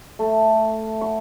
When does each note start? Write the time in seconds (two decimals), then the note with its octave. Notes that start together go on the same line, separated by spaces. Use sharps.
0.19 A3
1.01 C#6